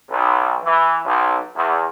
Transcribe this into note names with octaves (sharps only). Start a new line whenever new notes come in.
B1
E3
B1
E2